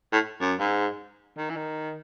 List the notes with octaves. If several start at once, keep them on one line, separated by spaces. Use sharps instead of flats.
A2
F#2
G#2
D#3
E3
D#3